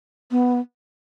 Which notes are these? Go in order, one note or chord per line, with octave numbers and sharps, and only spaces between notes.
B3